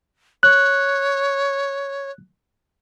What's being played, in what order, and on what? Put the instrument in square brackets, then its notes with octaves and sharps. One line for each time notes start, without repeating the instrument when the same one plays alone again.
[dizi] C#5 [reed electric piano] F#6